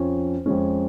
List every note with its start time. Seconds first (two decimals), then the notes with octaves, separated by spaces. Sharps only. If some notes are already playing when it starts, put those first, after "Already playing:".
Already playing: F2 F3 C#4
0.46 F2 F3 G#3 C#4